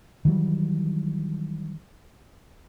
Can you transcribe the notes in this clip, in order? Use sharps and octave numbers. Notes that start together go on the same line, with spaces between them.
D#3 E3 F#3 G3